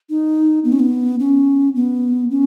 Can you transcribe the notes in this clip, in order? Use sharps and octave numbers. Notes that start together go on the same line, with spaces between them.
D#4
B3
C#4
B3
C#4
B3
C#4